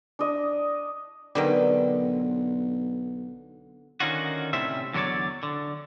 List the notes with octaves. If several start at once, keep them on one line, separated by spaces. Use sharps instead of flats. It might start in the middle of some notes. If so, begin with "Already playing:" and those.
D4 D#5
B1 B2 D3 D#3 G3 B3 C4
D3 D#3 C#4 D#4 F4 F#4
A2 C3 G3 C#4 C5 E5
E2 D3 F#3 A#4 C#5 D5
D3